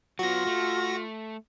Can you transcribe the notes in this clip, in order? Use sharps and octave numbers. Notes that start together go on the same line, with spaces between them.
F#3 B3 F4 F#4 A#6
A3